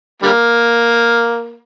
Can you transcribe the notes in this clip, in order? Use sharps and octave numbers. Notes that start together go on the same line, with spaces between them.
D3 G3 A#3